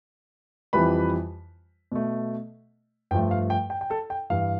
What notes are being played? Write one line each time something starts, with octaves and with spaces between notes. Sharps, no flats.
F2 E3 G3 B4 B5
B2 A3
G2 F3 A3 G5
F5
G5
G5
G5
A4 A5
G5
G2 E3 G3 F5